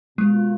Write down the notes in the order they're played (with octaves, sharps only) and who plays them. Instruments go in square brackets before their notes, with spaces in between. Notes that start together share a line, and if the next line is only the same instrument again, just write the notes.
[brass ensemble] B2 A#3 F4 [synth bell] G#3